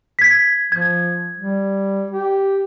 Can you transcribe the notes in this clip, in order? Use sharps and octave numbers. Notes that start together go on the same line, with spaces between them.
G#6 B6
F3 G#6
G3
G4